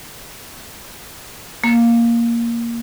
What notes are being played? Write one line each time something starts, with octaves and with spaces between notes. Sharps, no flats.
A#3